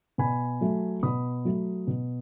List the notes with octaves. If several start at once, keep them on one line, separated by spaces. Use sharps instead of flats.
B2 G#5 B5
F#3 A3
B2 B5 D#6
F#3 A3
B2